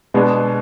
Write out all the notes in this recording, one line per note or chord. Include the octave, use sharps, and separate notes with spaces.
B2 G#3 B3 D4 G#4